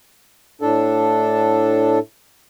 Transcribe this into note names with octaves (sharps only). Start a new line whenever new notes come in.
A2 D4 A4